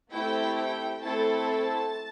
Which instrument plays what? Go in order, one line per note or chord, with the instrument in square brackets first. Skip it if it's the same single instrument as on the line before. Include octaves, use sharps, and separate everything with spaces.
[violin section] A3 C4 E4 G4 G5
G5
A3 C4 E4 A4 A5